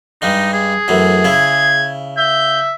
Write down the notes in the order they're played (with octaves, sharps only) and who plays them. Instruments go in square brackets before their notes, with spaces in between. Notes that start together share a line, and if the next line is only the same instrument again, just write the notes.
[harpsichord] G2 G3 G#3 [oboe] D#4
[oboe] G#4
[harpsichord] F#2 A2 E3
[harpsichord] C#3 E4 [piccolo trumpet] G#6
[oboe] E5 [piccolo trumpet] G6